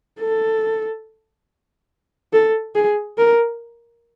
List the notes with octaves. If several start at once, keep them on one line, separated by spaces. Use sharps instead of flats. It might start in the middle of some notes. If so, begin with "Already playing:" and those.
A4
A4
G#4
A#4